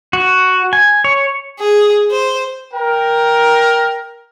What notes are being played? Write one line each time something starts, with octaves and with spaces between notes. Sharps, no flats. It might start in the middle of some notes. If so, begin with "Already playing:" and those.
F#4
G#5
C#5
G#4
C5
A#4 G5